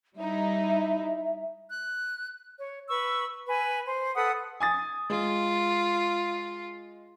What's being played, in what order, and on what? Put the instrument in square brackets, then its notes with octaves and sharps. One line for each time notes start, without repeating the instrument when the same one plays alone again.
[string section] G3 D#4 E4 [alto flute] E5
[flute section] F#6
C#5
B4 C#6 E6
B4 G#5
C5
A4 B4 F#5 D#6
[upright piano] G#5 D#6 A6
[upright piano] G#3 [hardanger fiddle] F4